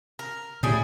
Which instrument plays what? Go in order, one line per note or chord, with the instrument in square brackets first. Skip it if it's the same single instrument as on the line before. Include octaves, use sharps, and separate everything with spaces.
[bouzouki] A#4
[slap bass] A2 [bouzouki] G3 G#4